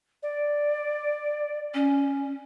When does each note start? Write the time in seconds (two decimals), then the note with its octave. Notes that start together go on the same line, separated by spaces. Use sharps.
0.23 D5
1.74 C#4